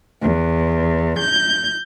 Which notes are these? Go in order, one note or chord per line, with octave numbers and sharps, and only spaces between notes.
E2
G6